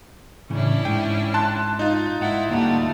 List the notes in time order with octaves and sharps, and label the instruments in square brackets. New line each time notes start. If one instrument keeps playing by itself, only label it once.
[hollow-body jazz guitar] A2 C#3 E3 [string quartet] C#4 D4 E4
[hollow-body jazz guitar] G#2 [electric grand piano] G5
[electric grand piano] A5 C6 F#6
D#4 F4
[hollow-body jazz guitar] G#2 F#5 [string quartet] E4
[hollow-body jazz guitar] D2 A#3 F#5 [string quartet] G3 A3